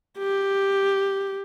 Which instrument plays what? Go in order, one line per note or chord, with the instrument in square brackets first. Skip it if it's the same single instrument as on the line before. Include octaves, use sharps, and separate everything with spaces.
[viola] G4